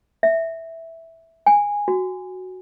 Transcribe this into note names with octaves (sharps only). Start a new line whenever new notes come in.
E5
G#5
F#4